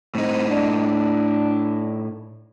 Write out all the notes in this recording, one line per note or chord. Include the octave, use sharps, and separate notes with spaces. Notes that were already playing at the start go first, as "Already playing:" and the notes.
A2 C4 D#4
D4